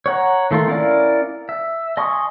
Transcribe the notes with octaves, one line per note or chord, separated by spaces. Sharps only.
C#5 F#5 A#5
D#3 A3 F4 C6
C#4 E4 A#4 D5 F5
E5
D#5 G#5 C6 C#6 D#6